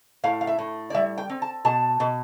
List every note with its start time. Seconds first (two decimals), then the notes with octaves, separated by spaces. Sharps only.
0.24 A2 F5
0.41 F5
0.47 E5
0.59 A2
0.90 D5
0.94 G3 E5
1.18 G5
1.30 C4
1.42 A5
1.65 B2 A5
2.00 B2